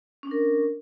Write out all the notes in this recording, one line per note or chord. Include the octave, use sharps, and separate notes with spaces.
C#4 D4 A#4